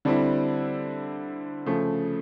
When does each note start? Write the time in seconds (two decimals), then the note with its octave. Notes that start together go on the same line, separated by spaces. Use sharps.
0.05 D3 G3 C4 E4
1.66 C#3 F3 A3